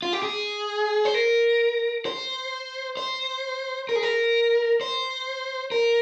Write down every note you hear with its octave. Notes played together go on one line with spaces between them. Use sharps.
F4
G4
G#4
C5
A#4
C5
C5
A#4
G#4
A#4
C5
A#4